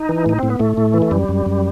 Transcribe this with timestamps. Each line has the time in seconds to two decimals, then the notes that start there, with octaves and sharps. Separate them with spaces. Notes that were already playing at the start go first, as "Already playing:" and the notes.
Already playing: D#4
0.09 E3
0.26 A2 D#4
0.39 A2 C4
0.50 B3
0.59 A2 A3
0.77 A2
0.94 E3
1.02 A3
1.11 F#2 G3
1.29 F#2
1.46 F#2